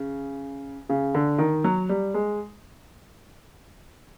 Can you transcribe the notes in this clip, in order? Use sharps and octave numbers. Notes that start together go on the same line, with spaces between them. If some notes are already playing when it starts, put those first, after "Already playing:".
Already playing: C#3
C#3
D3
D#3
F#3
G3
G#3